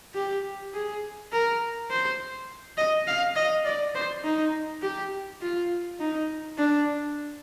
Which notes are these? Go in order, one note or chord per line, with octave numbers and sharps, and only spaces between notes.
G4
G#4
A#4
C5
D#5
F5
D#5
D5
C5
D#4
G4
F4
D#4
D4